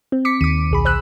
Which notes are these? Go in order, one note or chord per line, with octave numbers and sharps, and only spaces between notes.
C4
D6 B6 C#7
D#2 D6 D#7
B1 G#4 B5
C5 E6 F#6